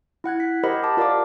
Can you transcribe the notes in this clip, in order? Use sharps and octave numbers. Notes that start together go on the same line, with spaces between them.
E4 F#5 F#6 G#6
B6
G4 A#4 C5 D#5 F#5 B5
A5 D6
F4 A#4 D5 F5 A5 D6